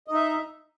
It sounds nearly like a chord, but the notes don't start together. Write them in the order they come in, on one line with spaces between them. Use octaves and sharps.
D#5 D#4 E5